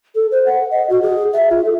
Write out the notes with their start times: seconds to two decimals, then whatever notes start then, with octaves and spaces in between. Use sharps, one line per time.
0.15 A4
0.31 C5
0.46 F#5
0.71 D#5
0.89 F#4
1.02 G#4
1.33 E5
1.50 F4
1.65 A4